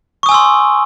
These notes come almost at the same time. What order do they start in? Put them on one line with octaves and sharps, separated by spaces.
C#6 D#6 G#5 E6 C6